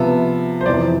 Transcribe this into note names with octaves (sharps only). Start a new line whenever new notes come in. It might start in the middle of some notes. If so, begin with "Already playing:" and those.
Already playing: C3 F3 B3 E5
C5
F2 C3 E3 D5